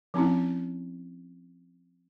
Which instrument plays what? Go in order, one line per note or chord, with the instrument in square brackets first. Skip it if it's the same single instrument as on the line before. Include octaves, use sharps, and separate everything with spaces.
[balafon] F3 C4 C#4 E4